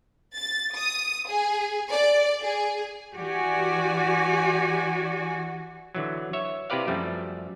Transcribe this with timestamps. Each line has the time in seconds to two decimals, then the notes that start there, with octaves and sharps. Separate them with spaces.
0.36 A6
0.76 D#6
1.28 G#4
1.91 D5
2.41 G#4
3.16 E3 F#4 G4 D5 G#5
5.95 D3 E3 F#3
6.33 C#5 E5
6.70 C3 E4 G4 B4 D5 F5
6.87 F#2 F3 G3 A3